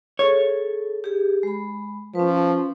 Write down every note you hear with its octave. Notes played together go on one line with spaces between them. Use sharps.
G#4 A4 C#5
G4 G#4
G#3 B5
F3 C#4 B4